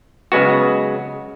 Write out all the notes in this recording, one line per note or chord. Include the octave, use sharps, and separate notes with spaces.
C#3 F#3 G#3 B3 F#4